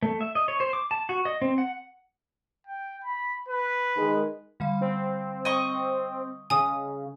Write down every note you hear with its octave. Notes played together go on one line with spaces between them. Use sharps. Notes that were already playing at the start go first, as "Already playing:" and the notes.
A3
E5
D#5
C#5
C5
D6
A5
F#4
D#5
C4
F#5
G5
B5
B4
D#3 G#3
D3 G3 F5
C4
D#5 C#6
C#3 G#5 D#6